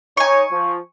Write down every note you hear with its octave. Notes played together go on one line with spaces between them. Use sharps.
D#4 C#5 G#5 C#6
F3